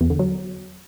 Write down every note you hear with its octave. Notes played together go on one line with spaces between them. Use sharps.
E2
D3
F#3